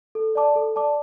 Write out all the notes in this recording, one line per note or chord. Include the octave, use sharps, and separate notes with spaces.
A4
D5 A5 D6
A4
D5 A5 D6